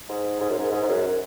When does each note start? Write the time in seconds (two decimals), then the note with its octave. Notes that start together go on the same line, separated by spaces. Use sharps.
0.09 G#2
0.40 G#2
0.49 F#2
0.58 G#2
0.71 G#2
0.83 G#2
0.88 F#2